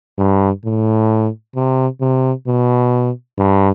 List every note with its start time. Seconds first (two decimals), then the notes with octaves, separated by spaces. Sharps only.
0.18 G2
0.65 A2
1.55 C3
2.01 C3
2.47 B2
3.38 G2